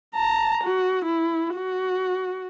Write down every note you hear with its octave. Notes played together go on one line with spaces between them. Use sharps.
A5 A#5
F#4
E4
F#4